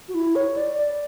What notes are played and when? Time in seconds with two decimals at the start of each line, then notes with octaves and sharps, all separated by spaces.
0.09 F#4
0.14 E4
0.36 C#5
0.57 D5
0.78 D5